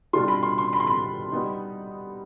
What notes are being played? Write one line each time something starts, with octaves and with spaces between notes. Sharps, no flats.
B2 G3 D4 F4 C6
B5
C6
C6
B5
C6
B5
G3 B3 D#4